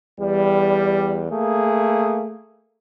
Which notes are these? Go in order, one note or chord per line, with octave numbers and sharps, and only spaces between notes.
E2 G3
A3 A#3 G#4